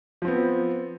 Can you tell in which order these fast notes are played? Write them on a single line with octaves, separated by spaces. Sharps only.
F3 C4 B3